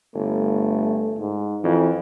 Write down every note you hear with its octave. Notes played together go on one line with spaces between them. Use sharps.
G1 A3
G#2
F2 E3